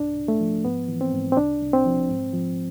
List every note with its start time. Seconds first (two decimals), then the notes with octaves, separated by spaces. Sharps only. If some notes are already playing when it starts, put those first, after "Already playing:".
Already playing: C2 G#2 D4
0.17 C2
0.28 A3
0.40 F3
0.65 G#2 B3
0.88 E3
1.01 C4
1.13 G#2
1.32 C4
1.37 C2 D4
1.61 C2
1.73 C4
1.85 F3
2.09 G#2
2.33 F3